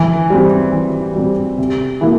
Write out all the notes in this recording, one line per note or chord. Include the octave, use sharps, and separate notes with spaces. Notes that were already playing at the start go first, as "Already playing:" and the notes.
Already playing: E3
G3 C4
E3
G3 C4
C3
E3 A#3 E4